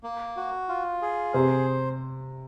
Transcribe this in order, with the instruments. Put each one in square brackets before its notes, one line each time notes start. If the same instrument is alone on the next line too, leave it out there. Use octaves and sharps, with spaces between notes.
[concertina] A#3
F#4
F4
G#4
[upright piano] C3 [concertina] C5